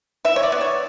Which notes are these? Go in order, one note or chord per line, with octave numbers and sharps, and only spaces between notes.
E3 E5
C#5
D5
B3
C#5